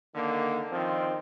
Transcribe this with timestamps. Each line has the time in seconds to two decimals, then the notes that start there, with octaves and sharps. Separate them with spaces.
0.15 D3 D#3 A#3
0.72 D#3 F3 C4